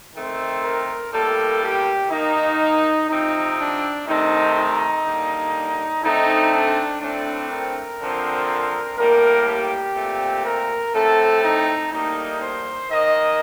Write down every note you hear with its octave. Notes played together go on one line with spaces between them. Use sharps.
D#3 A3 C4
A#4
A2 G3 A#3 A4
G4
D#3 A#3 D#4
C3 F3 C4 D#4
D4
C3 D#3 A3 C4 D#4
D#4
D3 G3 A#3
D3 A3 C4 D#4
D4
A2 A3 C4 D4
A#4
D3 F3 C4
A2 G3 A#3 A#4
G4
A#2 A3 C4
A#4
A2 A3 C4 A4
D#4
A2 G3 A#3 D#4
C5
D#3 A#3 D#5